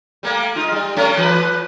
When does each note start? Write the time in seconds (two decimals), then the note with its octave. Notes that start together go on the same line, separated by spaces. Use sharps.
0.23 G3 A3 A#3
0.56 G#3 D#4 F4
0.72 G3
0.96 G3 A3 C#4
1.17 E3 B4